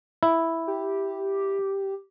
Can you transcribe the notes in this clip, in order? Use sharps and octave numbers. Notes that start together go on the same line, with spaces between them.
E4
G4